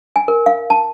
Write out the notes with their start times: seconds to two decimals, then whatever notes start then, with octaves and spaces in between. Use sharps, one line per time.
0.16 G#5
0.28 A#4
0.46 F5
0.70 A5